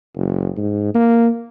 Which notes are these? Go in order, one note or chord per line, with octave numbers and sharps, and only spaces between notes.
F#1
G#2
A#3